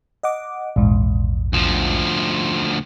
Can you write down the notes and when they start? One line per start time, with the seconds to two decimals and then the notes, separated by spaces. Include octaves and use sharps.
0.23 D#5 F#5 D6
0.76 A#1 E2 G#2
1.53 D2 F3